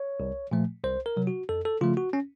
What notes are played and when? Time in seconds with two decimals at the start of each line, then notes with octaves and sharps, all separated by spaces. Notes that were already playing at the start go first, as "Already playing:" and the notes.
Already playing: C#5
0.20 C2
0.51 A#2 F3 A3
0.84 C2 C5
1.06 A#4
1.17 C3 F#3
1.27 F#4
1.49 F2 A4
1.65 A4
1.81 C#3 F3 A3 F4
1.97 F#4
2.13 C#4